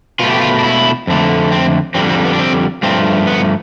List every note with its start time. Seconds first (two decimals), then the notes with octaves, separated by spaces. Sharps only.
0.19 B2 A3 F4
0.30 G4
0.41 F4
0.59 D4
0.63 E4
1.07 F2 D3 A3
1.52 C4
1.95 F2 D3 G3 C4
2.09 C4
2.25 B3
2.33 D4
2.39 C4
2.83 G2 F3 A3 C4
3.27 B3